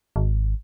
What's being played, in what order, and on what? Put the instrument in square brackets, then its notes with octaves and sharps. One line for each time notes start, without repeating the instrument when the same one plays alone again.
[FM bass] G#1